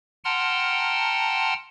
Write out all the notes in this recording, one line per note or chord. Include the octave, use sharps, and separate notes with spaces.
F#5 G5 A5 A#5 C6 F6